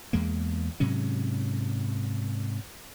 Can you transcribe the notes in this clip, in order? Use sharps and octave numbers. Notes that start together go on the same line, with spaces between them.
E2 G#3 A#3
G#2 C3 F#3 C#4